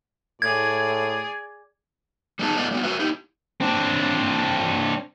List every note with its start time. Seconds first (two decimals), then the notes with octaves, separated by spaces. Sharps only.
0.42 A2 G#4 D5 G#6
2.39 G3 B3 D#4 G#4 A5
2.57 A3 B3 E4 D5 D#5
2.71 G3 B3 F#4
2.83 F#4 A#4 B4 E5
2.99 D#4 E4 G4
3.61 C4 D4